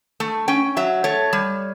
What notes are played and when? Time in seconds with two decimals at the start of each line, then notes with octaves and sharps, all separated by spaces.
0.20 A3
0.48 C#4 G5
0.77 F#3 E5
1.04 A3 C#5
1.33 G3